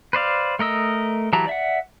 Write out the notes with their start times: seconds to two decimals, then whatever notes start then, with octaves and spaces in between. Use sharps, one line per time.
0.13 B4 C5 D5 F5
0.59 A3 A#4 D#5 E6
1.33 E3 F#3 G4 A5 A#5
1.47 D5 E5 F#5